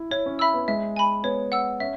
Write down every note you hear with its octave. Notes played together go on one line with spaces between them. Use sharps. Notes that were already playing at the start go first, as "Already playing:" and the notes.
Already playing: E4
E4 C#5
C#4
E5 B5 E6
B3
G#3 E5
G#5 B5
B3 C#5
F#5 E6
C#4 E5